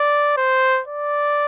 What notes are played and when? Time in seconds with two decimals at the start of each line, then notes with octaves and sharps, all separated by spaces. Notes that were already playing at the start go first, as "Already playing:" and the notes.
Already playing: D5
0.37 C5
0.88 D5